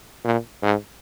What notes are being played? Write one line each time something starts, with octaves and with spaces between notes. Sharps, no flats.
A#2
G#2